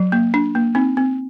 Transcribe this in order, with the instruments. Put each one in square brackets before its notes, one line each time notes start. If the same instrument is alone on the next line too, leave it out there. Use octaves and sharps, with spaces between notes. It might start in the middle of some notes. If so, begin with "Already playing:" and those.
Already playing: [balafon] F#3
A#3
D4
A#3
C4 D#4
C4